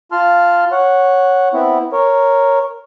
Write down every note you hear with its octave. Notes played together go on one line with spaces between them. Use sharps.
F4 A5 C6 F6
C#5 F#5
B3 C4 E4
A#4 C#5